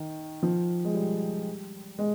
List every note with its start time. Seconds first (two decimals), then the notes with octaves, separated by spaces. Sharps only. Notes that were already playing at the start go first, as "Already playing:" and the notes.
Already playing: D#3
0.43 F3
0.85 G#3
0.94 G3
1.99 G#3